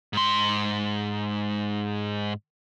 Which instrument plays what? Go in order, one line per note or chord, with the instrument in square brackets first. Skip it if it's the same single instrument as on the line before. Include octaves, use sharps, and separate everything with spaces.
[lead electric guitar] G#2 C6